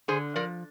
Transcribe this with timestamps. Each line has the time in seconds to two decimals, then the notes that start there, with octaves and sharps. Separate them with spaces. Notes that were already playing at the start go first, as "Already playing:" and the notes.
0.08 D3 G#4 C5
0.36 F3 A#4 D5